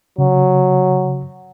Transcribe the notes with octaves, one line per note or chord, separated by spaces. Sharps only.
C#3 F#3